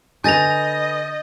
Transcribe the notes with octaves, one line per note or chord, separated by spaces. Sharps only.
D3 B4 D#5 G#5 G6 A6 A#6 F7